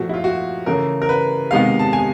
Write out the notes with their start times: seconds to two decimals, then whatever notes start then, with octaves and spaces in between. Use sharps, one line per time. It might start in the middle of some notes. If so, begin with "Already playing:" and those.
Already playing: A#2 F3 A3 F#4
0.09 E4
0.14 F4
0.24 F#4
0.66 C#3 E3 A3 A#4
1.02 A#4
1.09 B4
1.51 C3 D#3 G#3 B3 F5
1.79 A5
1.93 G#5